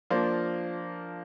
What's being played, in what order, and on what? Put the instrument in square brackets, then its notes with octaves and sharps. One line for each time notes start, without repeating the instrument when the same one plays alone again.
[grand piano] F3 A#3 D4 [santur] F4